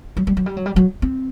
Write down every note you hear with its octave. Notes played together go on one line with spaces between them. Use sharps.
F#3
G3
F#3
G3
F#3
G3
F#3
C4